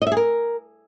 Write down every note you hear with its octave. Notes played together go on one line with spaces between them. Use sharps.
D#5
E5
G#4
A#4